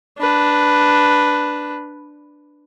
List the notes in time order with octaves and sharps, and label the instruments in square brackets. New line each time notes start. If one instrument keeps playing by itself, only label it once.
[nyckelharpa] D4 B4